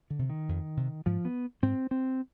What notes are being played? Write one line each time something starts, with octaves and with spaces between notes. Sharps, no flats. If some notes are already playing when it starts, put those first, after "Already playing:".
D3
C3
D#3
F2
C3
G#2 F3
B3
G#2 C4
C4